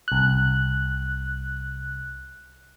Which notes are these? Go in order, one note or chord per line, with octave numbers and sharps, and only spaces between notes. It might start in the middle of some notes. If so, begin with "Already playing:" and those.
C2 F#6